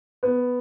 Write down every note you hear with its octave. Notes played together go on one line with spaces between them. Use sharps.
B3